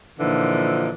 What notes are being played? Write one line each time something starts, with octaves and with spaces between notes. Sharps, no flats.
A#2 D3 E3 F3 D#4